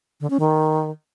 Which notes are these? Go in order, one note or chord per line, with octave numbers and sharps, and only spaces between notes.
D3
C#4
D#3